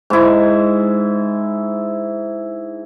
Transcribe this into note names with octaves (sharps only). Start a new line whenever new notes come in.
G#2 E4